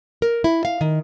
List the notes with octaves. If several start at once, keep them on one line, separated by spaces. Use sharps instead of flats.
A#4
E4
F5
D#3